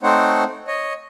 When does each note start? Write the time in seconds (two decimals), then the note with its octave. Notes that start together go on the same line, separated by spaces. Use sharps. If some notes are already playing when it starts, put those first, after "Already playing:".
0.03 A3 C4 D#4 C5 C#5 F#5
0.67 C#5 D#5